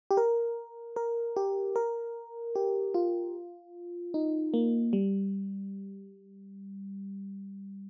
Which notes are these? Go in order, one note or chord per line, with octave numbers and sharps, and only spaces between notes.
G4
A#4
A#4
G4
A#4
G4
F4
D#4
A#3
G3